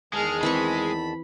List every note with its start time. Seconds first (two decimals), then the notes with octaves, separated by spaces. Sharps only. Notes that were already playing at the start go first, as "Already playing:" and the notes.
0.13 E2 D#3 G#3 G#4 A5 F6
0.43 E3 C4 B5 C#6